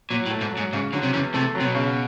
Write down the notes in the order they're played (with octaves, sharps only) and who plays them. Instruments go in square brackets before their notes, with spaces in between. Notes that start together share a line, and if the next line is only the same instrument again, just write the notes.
[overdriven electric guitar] A#2 [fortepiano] F#3
[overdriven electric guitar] A2
[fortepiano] A3
[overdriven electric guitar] G#2
[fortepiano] F#3
[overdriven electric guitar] G#2
[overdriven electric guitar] G#2 [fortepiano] C#3
[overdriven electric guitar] D3 [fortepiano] F#3
[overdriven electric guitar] C3
[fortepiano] E2 [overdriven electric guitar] C#3
[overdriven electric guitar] C3 [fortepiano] A3
[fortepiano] F#3
[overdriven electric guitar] C3
B2
[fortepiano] C#3